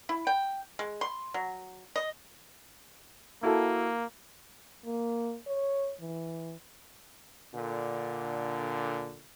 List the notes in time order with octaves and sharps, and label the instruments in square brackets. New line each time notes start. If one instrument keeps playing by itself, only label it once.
[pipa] E4
G5
G#3
C6
F#3
D#5
[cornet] A#3 [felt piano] E4 F#4 A4
[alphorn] A#3
C#5
E3
[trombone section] A#2 D3